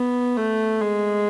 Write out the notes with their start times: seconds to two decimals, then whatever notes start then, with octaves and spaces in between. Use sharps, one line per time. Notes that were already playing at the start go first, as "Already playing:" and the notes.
Already playing: B3
0.37 A3
0.81 G#3